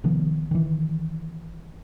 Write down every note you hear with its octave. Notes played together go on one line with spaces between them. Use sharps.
C3 D#3 F3 B3
D#3 E3